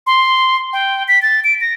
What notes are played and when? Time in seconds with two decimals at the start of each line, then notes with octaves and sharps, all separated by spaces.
0.07 C6
0.73 G5
1.08 B6
1.22 A6
1.44 D7
1.61 A#6